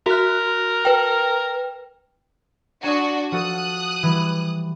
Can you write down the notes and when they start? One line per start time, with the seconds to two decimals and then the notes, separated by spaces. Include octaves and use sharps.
0.06 F#4 A#4 F#6
0.85 B4 G5
2.83 D4 F#4 G#5 D#6
3.32 F3 F#4 A4 D#6 F#6
4.03 E3 G3